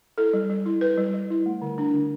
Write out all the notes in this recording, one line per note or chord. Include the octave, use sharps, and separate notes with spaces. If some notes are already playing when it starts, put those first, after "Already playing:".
E4 A4
G3
G3
E4
E4 B4
G3
G3
E4
A3
D3
D4
D3